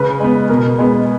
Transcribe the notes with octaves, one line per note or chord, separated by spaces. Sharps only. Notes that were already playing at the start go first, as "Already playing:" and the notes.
Already playing: C#3 B4
G#3 B3
B2 A#4
G#3 B3